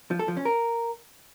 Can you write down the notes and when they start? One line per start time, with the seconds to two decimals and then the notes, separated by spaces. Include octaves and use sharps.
0.11 F3
0.19 A4
0.28 F3
0.37 C#4
0.45 A#4